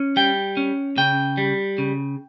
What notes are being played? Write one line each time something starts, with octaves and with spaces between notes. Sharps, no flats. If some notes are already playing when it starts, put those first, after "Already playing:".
Already playing: C#4
G3 G5
C#4
C#3 G5
G3
C#3